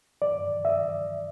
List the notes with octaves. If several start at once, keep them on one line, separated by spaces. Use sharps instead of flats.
D5
E5
D5